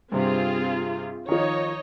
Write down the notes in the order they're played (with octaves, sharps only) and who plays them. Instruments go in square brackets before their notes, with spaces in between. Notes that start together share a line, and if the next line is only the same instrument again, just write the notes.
[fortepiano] G2 C3 [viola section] C4 F4 G#4
[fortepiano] D#3 F3 [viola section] D#4 C#5 D#5